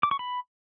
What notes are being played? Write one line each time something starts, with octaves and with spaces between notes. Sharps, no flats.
D6
C#6
B5